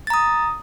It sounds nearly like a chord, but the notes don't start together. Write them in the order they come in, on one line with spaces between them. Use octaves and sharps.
A6 A#5 D#6